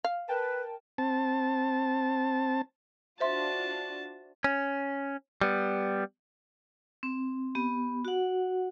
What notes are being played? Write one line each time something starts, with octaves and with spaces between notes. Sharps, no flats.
F5
A#4 B4 G5 A5
C4 A5
D4 F4 F#4 C5 E5 A5 C6
C#4
G3 B3
C4
B3 G4
F#4 F#5